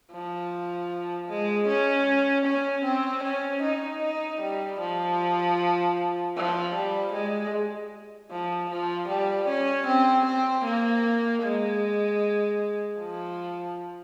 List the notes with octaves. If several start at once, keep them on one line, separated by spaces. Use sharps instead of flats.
F3
G#3
C#4
C#4
C4
C#4
D#4
D#4
G3
F3
F3
G3
G#3
F3
F3
G3
C#4
C4
C4
A#3
G#3
F3